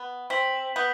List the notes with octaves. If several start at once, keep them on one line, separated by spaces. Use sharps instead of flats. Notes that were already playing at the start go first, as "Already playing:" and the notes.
Already playing: B3
C4 B6 F#7
B3 G6